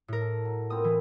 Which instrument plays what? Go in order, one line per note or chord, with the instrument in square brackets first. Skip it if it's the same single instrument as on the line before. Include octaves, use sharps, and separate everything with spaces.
[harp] A2 A#4
[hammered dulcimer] A4
F#3
[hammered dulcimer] A#2 B3 C4 [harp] D#6
[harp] E3